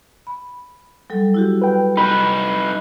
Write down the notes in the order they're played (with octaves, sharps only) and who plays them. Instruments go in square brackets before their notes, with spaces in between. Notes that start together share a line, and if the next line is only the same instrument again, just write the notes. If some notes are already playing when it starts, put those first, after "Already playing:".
[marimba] B5
F#3 G3 A4
E4 F#4 G4
[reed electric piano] B4 G5
[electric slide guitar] D#4 B4 [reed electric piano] B5